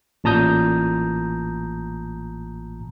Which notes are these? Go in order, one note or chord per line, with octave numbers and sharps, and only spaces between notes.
A1 A#2 A5 A#5 D#6 G6